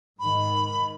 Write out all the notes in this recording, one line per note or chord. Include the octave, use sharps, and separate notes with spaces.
G#2 D#3 B5